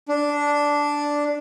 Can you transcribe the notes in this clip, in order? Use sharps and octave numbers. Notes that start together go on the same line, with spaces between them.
D4